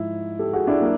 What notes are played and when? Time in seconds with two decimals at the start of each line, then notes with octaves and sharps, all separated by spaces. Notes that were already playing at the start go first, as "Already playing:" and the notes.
Already playing: G#2 F3 E4
0.39 G4 A4
0.53 F#4 G#4
0.67 D4 E4
0.81 F#3 A#3